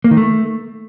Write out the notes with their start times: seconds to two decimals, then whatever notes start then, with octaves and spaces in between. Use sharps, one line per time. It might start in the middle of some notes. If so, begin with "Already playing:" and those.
0.04 A#3
0.11 D#3
0.17 A3